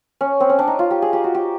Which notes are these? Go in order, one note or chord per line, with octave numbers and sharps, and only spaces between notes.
C#4
C4
C#4
D4
D#4
F4
G4
G#4
G4
F#4
G4